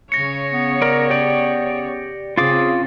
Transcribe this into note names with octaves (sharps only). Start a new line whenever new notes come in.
C#3 C#5 A#6 C#7
B3
A#4 D5
G4 D5
C#3 C4 F4 G#4 F5 D6 A6